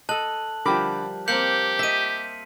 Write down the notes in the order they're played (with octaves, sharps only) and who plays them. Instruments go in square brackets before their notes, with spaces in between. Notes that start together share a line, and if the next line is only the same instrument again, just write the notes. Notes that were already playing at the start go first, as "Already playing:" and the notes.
[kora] A4 D#5 [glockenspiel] A5 F#6 F#7
[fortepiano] D3 B5 D6 [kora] F3 G3 A#4
[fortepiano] A#3 C4 [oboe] G4 [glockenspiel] G6 C#7 F#7
[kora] D#5 E5 [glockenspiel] B6 D#7